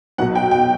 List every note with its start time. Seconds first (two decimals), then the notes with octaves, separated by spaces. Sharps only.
0.18 B1 B2 F#3 F#5
0.35 G5
0.51 G5